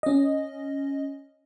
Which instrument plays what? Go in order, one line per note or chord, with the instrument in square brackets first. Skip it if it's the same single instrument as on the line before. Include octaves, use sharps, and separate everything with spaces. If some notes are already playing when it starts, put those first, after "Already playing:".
[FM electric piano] C#4 D#5